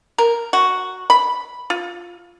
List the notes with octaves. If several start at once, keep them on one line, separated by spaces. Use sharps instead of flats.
A#4
F#4
B5
F4